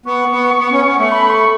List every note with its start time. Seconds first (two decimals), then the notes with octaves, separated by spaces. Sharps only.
0.06 B3 C#6
0.32 B3
0.59 B3
0.72 C#4
0.86 B3
0.98 A3
1.12 B5
1.30 C#6